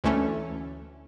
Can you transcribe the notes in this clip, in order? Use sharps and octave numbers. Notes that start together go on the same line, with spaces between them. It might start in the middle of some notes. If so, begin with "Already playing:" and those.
D2 E3 A3 C#4